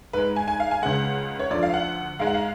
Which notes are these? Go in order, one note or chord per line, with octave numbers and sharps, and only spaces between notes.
G#2 G#3 B4
G#5
G#5
F5
G#5
C#2 C#3 G#3 F#5
C#5
D2 D3 F3 D5
F5
F#5
G#2 G#3 F5
F#5
F5